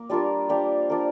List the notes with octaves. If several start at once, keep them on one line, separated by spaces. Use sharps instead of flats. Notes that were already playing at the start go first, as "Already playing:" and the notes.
Already playing: A#3
G3 D4 F4 A#4
D4 G4 C5 F5
D4 F4 A#4